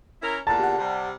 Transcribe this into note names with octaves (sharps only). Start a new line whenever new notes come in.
C#4 E4 A#4
E2 A#2 D3 A5 A#5 A6
G4 F#5
C3 G3